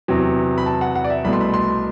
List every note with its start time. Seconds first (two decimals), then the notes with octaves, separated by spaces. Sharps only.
0.08 E2 C3 F#3
0.58 B5
0.66 A5
0.81 F#5
0.95 F#5
1.04 D5
1.10 E5
1.24 C2 B2 A3 B5
1.33 C6
1.41 B5
1.54 C6